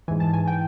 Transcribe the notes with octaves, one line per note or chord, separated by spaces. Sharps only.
G#2 E3 G#5
A5
G#5
G5